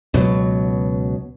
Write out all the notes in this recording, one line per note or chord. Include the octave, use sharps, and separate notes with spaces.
C#2 B2 F#3